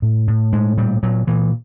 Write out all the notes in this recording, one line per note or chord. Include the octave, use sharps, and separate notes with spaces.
A2
A2
A2 G#3
A#2 G3
A#2 F#3
A#2 E3